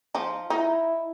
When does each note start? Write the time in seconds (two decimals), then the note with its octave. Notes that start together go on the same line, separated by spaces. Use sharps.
0.15 F3 D#4
0.50 D#4 E4